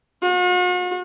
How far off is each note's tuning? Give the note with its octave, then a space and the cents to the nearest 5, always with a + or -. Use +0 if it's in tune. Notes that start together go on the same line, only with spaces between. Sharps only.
F#4 -45